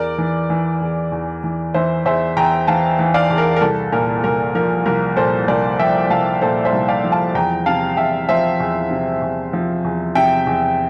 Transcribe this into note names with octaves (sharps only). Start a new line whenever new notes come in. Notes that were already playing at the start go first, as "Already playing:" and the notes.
Already playing: E2 A#4 D5
E3
E3
E2
E2
E3
E3 C5 E5
E2 C5 E5
E2 G5 A#5
E3 F5 A5
E3
D5 F5
E2
A#4
A#4
C2 A4
A#2 A#4
C2 A#4
F3 A#4
C2 A#4
A#2 A4 C5
C2 A#4 D5
F3 E5 G5
C2 F5 A5
A#2 A4 C5
C5 E5
C2
D5 F5
F3
F5 A5
E2 G5 A#5
C3 F5 A5
E2 E5 G5
F3 C5 E5
E2
C3
E2
F3
E2
C3 E5 G5
E2